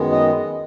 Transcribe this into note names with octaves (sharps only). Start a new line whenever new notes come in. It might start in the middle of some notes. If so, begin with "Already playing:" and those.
Already playing: F#2 D#3 G#3 B3
D#5